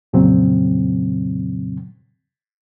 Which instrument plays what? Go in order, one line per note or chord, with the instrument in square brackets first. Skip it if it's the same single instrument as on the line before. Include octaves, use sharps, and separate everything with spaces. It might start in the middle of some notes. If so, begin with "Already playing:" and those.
[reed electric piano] F2 A#2 C#3 F#3 C4